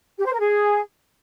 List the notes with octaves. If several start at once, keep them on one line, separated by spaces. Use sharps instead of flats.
G4
C5
A#4
G#4